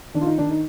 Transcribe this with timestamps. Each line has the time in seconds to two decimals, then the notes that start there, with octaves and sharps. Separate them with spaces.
0.14 D#3 D4
0.21 F4
0.26 D#4
0.38 D#3 D4
0.50 D#4